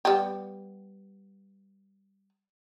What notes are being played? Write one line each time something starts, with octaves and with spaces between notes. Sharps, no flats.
G3 B3 G4